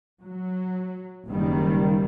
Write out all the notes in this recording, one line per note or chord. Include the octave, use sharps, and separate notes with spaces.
F#3
F#1 D#3 G3